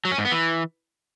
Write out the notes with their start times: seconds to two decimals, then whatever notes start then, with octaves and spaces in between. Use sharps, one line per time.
0.05 F#3
0.12 C#4
0.18 G#2
0.25 B3
0.32 E3